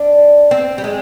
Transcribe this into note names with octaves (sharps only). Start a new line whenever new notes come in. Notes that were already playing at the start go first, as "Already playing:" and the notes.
Already playing: D4
C4
G3
G#3